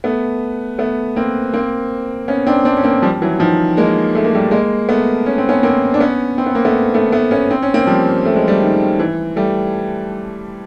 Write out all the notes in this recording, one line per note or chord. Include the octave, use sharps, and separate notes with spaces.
A3 B3
A3 B3
A#3 C4
A#3 C4
B3 C#4
C4 D4
C4 D4
C#4
A#3 C4
F3 G3
E3 F#3
D#3 F3
G#3 A#3
A3
A#3
G3 A3
G#3 A#3
A3 B3
C#4
C4
B3 C#4
A#3 C4
D4
B3 C#4
C4
B3
A#3
A3 B3
A3 B3
A3 B3
B3 C#4
C4
C#4
A#3 C4
F3 G3
A3
G#3
G3 A3
D#3
E3
G3 A3